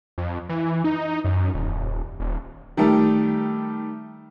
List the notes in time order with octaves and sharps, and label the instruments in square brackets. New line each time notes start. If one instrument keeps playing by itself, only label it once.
[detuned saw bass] F2
E3
D#4
F#2
D#1
D#1
[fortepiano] D#3 G3 A3 A#4